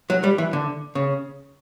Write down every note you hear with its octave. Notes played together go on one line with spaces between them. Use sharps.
F#3
G3
E3
D3
C#3